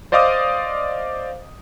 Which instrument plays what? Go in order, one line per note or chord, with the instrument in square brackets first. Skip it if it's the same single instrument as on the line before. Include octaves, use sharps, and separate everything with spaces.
[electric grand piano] C5 D5 D#5 F5 D6 D#6